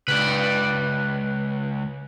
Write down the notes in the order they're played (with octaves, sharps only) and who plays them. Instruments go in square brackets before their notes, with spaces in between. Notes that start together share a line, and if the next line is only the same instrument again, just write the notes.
[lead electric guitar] C#2 [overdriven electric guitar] B4 D5